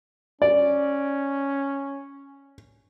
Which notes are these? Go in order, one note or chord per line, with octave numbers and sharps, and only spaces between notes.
C#4 D5